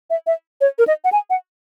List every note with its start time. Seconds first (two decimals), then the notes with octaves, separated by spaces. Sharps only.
0.10 E5
0.27 E5
0.61 C#5
0.78 A#4
0.87 D#5
1.04 F#5
1.12 G#5
1.30 F#5